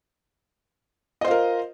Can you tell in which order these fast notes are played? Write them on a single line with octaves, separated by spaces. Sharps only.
D#5 C5 F4 A#4